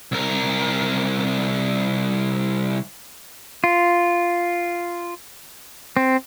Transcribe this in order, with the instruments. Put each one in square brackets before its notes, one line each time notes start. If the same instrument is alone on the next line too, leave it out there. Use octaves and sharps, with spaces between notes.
[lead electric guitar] C2 A#4
[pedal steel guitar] F4
C4